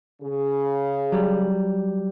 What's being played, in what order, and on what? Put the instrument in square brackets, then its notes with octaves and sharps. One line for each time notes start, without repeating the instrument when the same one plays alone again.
[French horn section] C#3 G#4
[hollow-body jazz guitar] F#3 G3